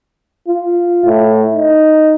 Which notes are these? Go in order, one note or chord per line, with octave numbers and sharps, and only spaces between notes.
F4
A2
D#4